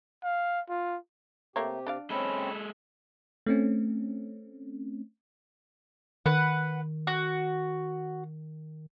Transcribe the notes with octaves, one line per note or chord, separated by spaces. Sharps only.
F5
F4
C3 A3 A#3 G4 C#5
D4 D5 F5
G#3 C4 C#4 A4 B5
A3 C4 C#4
D#3 B4 F#5
F#4